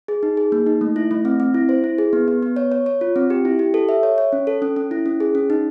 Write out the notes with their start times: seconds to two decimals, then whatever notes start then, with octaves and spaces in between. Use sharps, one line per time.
0.08 G#4
0.23 D#4
0.37 G#4
0.52 A#3
0.66 D#4
0.81 A3
0.96 E4
1.11 A3
1.25 C4
1.40 C4
1.54 E4
1.69 C5
1.84 E4
1.98 G#4
2.13 B3
2.28 B3
2.43 B3
2.56 C#5
2.72 C#5
2.86 C#5
3.01 F4
3.16 C4
3.30 G4
3.45 E4
3.59 G4
3.74 A4
3.89 E5
4.03 C#5
4.18 C#5
4.33 C#4
4.47 A4
4.62 C#4
4.76 C#4
4.91 E4
5.06 C#4
5.20 G#4
5.35 C#4
5.50 D#4